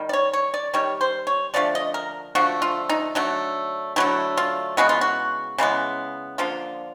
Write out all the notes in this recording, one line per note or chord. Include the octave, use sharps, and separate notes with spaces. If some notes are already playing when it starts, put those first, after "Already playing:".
Already playing: D#3 G3
D5
C#5
C#5
D5
D#3 G3 C#5
C5
C#5
D3 F3 A3 D5
D#5
A#4
D3 F3 A3 F#4
F4
D#4
D3 F#3 A3
D3 F#3 A3 E4
F4
C#3 E3 G#3 B3 F#4
F4
F#4
C#3 E3 G#3 B3
D3 F3 A#3 F4